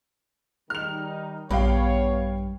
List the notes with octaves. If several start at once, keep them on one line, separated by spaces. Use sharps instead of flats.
D#3 G3 D#4 F6 F7
A#1 G2 B3 C#5 F5 G5 B5